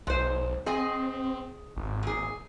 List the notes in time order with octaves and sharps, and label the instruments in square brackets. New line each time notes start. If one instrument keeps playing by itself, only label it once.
[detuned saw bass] B1 [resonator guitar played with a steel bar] G#3 C5
[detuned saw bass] C4 [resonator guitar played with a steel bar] G#4 D#5 G#5
[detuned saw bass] G#1
[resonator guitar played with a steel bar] A#2 G#4